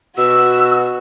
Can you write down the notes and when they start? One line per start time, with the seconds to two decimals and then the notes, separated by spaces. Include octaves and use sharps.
0.18 B2 F#4 E6